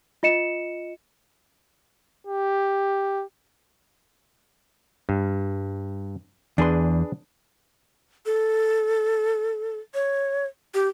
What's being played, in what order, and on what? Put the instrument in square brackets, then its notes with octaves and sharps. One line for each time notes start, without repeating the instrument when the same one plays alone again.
[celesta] F4 D#5 C#7 E7
[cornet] G4
[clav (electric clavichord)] G2
[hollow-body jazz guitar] E2 C6 [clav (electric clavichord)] D4 G#4 B4
[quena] A4
C#5
G4